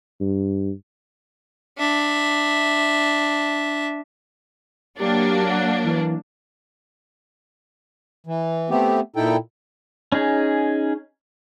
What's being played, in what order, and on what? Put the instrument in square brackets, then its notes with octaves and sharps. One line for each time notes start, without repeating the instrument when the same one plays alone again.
[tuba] G2
[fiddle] D4 E5
[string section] F#3 A#3 D4 [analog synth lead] G4
[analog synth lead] F#5
E3
[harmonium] E3
A3 B3 C4 G4
A#2 D#4 E4 A4 G5
[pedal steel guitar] C#4 D#4 G#4